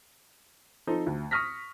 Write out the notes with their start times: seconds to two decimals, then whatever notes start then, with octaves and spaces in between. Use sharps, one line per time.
0.87 F3 C4 D#4 A4 C5
1.06 D2
1.31 C#6 D#6 F6 A#6 B6